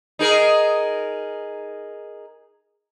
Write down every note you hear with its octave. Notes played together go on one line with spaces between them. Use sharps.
D#4 G#4 A#4